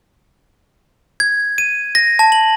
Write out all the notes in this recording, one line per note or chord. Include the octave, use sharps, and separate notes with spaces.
G#6
D#7
A#6
A5
F#7